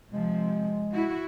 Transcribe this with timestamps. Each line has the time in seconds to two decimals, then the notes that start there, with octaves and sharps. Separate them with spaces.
0.11 C3 F3 G#3
0.92 E4 F#4